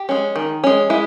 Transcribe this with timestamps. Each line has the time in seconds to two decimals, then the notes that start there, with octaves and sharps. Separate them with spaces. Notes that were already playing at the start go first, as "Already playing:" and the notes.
Already playing: G4
0.09 G#3 C#4
0.36 D#3
0.64 G#3 C#4
0.90 G#3 E4